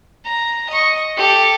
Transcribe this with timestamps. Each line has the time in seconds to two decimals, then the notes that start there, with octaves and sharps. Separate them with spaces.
0.25 A#5
0.69 D#5 C#6
1.17 G4 A4